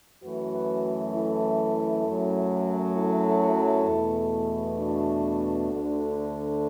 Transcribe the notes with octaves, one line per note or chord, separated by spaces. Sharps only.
F#2 E3 A3 F#4 B4
E4 A4
F#2 F#3 A3
E4 A4
E2 B2 A3
D4 F#4
D2 D3 A3